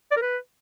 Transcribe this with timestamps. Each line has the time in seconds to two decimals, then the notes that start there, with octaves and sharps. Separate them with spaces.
0.11 D5
0.17 A#4
0.22 B4